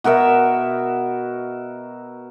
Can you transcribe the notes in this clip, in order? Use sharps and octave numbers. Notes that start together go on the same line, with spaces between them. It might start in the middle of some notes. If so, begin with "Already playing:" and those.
B2 F#4 A#4 E5